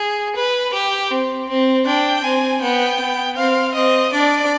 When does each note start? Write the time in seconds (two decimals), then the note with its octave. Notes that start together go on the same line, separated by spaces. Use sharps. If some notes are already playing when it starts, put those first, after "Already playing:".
Already playing: G#4
0.36 B4
0.73 G4
1.10 C4
1.49 C4
1.86 D4 G5
2.24 C4 G#5
2.62 B3 G5
2.99 B3
3.37 C4 F5
3.74 C4 D#5
4.12 D4 D5